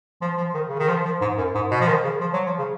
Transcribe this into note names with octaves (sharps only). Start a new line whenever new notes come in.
F3
F3
D#3
C#3
D#3
F3
F3
G#2
F#2
G#2
B2
F3
D#3
C#3
F3
F#3
F3
C#3